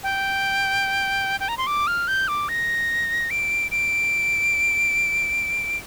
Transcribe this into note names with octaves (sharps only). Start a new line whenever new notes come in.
G5
G5
A#5
C6
D6
F6
G6
D6
A#6
D7
D7